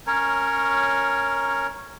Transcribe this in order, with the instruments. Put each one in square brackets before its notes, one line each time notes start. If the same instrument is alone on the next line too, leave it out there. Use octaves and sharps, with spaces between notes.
[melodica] C#4 A#4 C#5